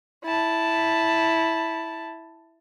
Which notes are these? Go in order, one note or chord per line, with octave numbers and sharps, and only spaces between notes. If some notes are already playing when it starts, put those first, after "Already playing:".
E4 A5